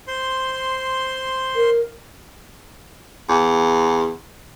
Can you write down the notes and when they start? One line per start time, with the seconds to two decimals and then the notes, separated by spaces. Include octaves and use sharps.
0.07 C5 C6
1.56 A#4
3.29 E2